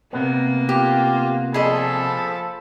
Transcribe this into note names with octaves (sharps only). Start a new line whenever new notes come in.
C3 A#3 B3
F4 G4
F3 G#4 A4 D#5 B5